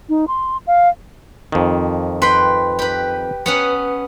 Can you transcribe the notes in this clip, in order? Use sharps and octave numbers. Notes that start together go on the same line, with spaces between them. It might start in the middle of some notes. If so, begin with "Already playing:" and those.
D#4
C6
F5
F2 D#3
B4 G5 B5 C6
G4 B4
B3 C#4 F#5 D#6